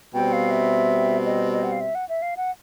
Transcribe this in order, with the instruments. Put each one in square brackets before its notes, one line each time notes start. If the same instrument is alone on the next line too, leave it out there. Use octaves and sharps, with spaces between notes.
[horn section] B2 G3 C4 [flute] G5
[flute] F5
E5
D#5
D#5
F#5
F5
E5
F#5
E5
F5
F#5